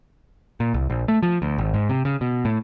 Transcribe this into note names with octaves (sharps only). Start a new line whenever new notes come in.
A#2
C2
A#1
A3
F3
D2
G#1
G#2
C3
C#3
B2
A2